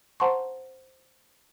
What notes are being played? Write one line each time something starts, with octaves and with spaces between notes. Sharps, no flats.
C5 F#5 A5 A#5 C6 C#6